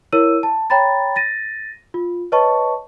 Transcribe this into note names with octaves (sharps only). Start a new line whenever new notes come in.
E4 A#4 C#5 E6 D#7
A5
C#5 G5 A#5 B5 A6
A6 A#6 D#7
F4
B4 C#5 D#5 A5 C#6